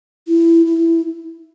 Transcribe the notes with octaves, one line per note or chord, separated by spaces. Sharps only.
E4
E4